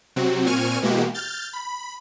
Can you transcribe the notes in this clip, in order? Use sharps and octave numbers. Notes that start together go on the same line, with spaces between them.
C3 F#3 C4 F#4
A#2 C4 G#5 C#6 F6 D#7
B2 E3 G#3 A#3 F#4 G4
F6 G6 A6
B5